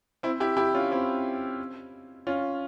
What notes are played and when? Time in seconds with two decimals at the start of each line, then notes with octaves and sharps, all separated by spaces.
0.23 C4 E4
0.40 E4 G4
0.57 E4 G4
0.74 C#4 F4
0.91 C4 E4
2.27 C#4 F4